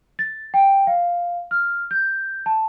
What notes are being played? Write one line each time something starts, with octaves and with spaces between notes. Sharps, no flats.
A6
G5
F5
F6
G6
A5